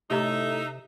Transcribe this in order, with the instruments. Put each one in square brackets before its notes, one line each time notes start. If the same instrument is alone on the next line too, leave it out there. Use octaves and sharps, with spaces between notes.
[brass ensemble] A2 A3 [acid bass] C3 [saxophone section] D#4 E5 [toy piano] G4 D#5 A#5